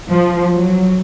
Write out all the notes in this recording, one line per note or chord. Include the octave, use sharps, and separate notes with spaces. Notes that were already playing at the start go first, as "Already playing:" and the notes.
F3
F#3